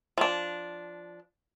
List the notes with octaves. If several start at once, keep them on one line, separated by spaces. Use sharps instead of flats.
F3 D4